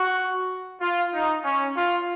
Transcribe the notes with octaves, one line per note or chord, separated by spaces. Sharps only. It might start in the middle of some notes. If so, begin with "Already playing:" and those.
Already playing: F#4
F4
D#4
C#4
F4